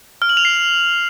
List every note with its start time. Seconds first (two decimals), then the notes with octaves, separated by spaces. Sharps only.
0.22 F6
0.29 F#7
0.37 F7
0.45 C7